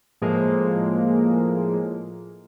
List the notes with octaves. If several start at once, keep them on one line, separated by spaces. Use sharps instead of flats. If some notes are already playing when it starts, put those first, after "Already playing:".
A2 F3 G#3 A#3